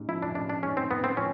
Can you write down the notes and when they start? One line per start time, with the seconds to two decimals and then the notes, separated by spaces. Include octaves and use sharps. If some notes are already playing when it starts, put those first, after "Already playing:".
Already playing: A1 G#2
0.08 F3 E4
0.22 D4
0.35 A1 D4
0.49 D4
0.63 G#2 C#4
0.77 C4
0.91 A1 B3
1.04 C4
1.17 F3 C#4